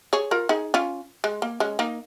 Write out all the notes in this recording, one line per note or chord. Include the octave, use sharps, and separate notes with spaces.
G#4 C#5
F4 A#4
D#4 G#4
C#4 F4
G#3
A#3
G#3 C#4
A#3 D#4